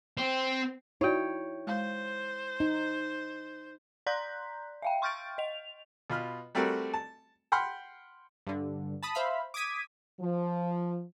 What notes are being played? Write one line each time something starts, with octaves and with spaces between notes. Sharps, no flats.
C4
D#4 E4 F#4 C#5 D5 G5
G#3 C5 F5
D#4
D5 A#5 C6 F#6 G6 B6
E5 F5 G5
C6 C#6 F6 G6 A6 D7
D#5 F7
B2 F4 B5 F6
G3 A3 C4 F#4 A4 A#4
A5
F#5 G5 B5 C6 F6
G2 D3
A5 B5 D#6
C5 E5 F5 B5
D6 D#6 G#6 B6 D#7
F3